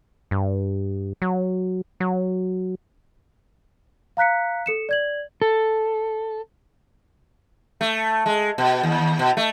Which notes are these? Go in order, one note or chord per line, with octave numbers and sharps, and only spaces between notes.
G2
F#3
F#3
F5 A#5 F#6 B6 C#7
A4 C#7 E7
D5 G#6 F#7
A4
A3
G#3
B2
D#2
B2
A3